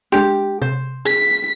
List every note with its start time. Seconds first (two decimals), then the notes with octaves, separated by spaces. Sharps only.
0.12 G#3 D4 G4 C6
0.62 C3 C5
1.06 G#4 B6